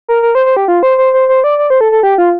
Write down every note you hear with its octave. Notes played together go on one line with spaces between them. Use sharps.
A#4
A#4
C5
C5
G4
F4
C5
C5
C5
C5
D5
D5
C5
A4
A4
G4
F4